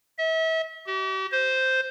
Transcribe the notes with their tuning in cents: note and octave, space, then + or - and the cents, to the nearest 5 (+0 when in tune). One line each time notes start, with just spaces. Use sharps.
E5 -35
G4 -45
C5 -5